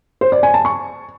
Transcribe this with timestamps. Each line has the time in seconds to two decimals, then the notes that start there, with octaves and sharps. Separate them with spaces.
0.21 C5
0.32 D5
0.43 G#5
0.54 A5
0.65 C#6